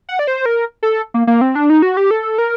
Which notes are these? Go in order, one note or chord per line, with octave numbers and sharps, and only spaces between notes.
F#5
D5
C5
A#4
A4
A#3
A#3
C4
D4
D#4
F#4
G4
A4
A#4